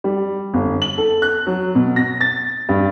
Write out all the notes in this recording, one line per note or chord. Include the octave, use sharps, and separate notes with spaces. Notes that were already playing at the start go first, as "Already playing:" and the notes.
G3
G1
F#7
A4
F#6
F#3
B2
A#6
A6
G2